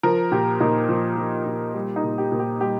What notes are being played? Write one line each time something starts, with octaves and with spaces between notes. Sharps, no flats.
F3 A#4
A#2 G4
A#2 D#4
F3
F3
A#2
G3
D#4
A#2
G4
A#2
G4
G3 G4